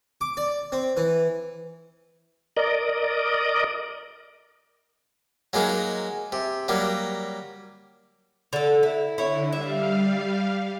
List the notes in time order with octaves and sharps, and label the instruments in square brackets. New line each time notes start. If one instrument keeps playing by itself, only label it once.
[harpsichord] D6
D5
C4
E3
[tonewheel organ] A#4 D5 D#5
[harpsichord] F#3 G#3 A#3 D#4
C3
F#3 G3 A#3
[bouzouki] D3 A4
E4
[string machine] D3 [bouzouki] E4 C#5
[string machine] G3 F5 [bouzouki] E5